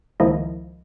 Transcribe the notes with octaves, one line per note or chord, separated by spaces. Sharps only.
C#2 D#3 F3 A#3 E4 D#5